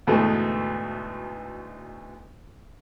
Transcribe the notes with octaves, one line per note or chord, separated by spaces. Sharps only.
D2 G#2 B2 E3 A3 B3